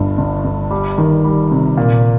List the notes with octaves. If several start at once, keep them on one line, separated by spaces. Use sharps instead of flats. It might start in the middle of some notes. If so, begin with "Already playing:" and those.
Already playing: G1 G2
G1
G1
G3
D#3
G3
C3
A#2